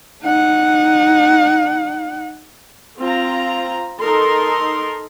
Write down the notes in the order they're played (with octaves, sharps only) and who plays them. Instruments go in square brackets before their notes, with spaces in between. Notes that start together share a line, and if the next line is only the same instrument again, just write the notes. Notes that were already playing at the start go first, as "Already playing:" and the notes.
[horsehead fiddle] D#4 F#5
[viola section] C4 F4 A#5
D#4 A4 A#4 C6